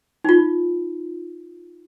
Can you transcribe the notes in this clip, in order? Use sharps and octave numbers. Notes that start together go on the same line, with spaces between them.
D#4 F4